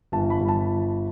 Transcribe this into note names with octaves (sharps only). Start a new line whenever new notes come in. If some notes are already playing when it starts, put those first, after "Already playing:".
G1 A5
A5
B5
G1
A5